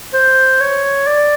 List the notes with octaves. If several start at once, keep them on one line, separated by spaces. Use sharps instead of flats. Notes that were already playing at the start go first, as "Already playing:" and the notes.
C5
C#5
D5